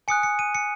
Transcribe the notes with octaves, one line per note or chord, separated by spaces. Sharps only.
G#5 D#6 F#6 C#7
C#7
D#7
C#7